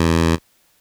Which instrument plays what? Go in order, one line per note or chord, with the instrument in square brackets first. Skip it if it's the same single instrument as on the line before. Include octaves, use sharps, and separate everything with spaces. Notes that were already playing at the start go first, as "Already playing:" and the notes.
Already playing: [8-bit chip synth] E2